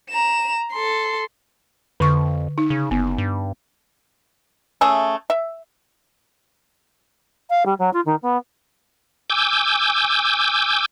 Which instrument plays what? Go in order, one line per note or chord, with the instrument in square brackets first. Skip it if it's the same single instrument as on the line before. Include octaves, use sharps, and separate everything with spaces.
[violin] A#5 E7
A4 C6
[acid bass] F2 [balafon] D3 C#6
[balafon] D#4
[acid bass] C#3
[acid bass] F#1 [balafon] B3
[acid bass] G2
[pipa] A3 C#4 G#4 E5
E5
[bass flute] F5
G3
F#3
F4
D#3
B3
[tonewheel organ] G#5 D6 E6 G6